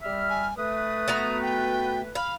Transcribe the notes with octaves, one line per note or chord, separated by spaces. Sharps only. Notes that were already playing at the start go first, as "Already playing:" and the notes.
G3 E5 F6
G#5
A3 B4 D#6
B3 F#4 A#5
G5
F5 B5